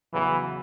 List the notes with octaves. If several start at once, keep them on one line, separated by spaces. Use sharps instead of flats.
E2 C#3 E3 F#3 B3 F#4